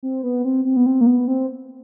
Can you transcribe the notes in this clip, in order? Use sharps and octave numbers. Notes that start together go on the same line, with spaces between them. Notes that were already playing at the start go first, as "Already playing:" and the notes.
C4
B3
C4
C4
B3
C4
A#3
B3
C4